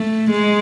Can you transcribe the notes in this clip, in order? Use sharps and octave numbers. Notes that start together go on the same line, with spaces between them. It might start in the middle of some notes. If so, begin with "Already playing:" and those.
Already playing: A3
G#3